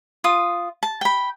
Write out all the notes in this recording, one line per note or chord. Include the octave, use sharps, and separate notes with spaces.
F4 D#6
A5
G5 B5